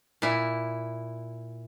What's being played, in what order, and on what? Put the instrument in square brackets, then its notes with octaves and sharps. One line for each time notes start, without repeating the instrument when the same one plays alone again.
[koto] A#2 E4